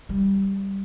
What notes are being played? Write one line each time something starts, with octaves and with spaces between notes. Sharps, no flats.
G3